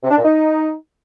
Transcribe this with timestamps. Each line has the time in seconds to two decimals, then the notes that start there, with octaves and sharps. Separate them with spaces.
0.03 C3
0.10 D4
0.18 A#2
0.25 D#4